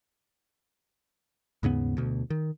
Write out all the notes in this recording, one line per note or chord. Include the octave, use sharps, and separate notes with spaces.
D#2 G#2 C#3 B3
D2 B2
D#3